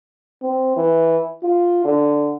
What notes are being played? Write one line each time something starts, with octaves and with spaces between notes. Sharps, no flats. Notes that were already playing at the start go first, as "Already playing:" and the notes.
C4
E3
F4
D3